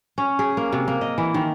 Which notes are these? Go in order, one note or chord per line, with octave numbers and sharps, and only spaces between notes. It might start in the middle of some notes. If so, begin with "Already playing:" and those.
C#4
G#4
A#3
C3
A#3
D#5
E3
D#3